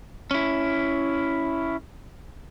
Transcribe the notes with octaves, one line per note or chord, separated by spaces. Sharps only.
C#4 E4